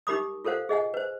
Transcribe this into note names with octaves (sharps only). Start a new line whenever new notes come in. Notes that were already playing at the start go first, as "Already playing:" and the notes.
D#4 G4 A#4 B5 D6 D#6
F4 A4 A#4 C5 F5 F#5
G#4 D#5 F#5 G#5
B4 C5